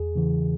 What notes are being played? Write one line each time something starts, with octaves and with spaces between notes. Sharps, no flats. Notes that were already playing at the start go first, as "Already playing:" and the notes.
Already playing: E2 G#4
C#3 E3